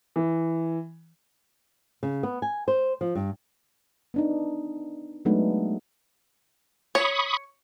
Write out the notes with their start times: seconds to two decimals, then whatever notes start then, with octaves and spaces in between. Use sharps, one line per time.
0.16 E3
2.03 C#3
2.23 B3
2.42 G#5
2.68 C5
3.01 F3
3.15 G2
4.14 B3 D4 D#4
5.25 F#3 G#3 A3 B3 D4 D#4
6.95 C#5 B5 C#6 D#6